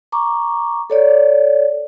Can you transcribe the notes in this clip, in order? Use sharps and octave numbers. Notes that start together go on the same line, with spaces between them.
A#5 C#6 D6
A4 C#5 D5